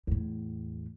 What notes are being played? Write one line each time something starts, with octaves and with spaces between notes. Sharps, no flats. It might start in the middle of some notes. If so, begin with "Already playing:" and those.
E2 A2